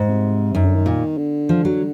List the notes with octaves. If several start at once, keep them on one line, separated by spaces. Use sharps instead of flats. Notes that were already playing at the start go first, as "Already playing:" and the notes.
Already playing: G#2
C3
F#2 D#3
D3
D#3
A#2
D3
F3
F#3